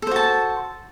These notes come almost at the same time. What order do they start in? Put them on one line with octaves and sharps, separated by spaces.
A4 C5 F#4 A5